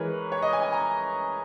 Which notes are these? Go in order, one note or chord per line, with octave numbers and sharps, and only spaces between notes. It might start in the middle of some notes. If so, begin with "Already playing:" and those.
Already playing: E3 G#3 A#4 B4 C#5
C#5
D#5
G#5
G#5
A#5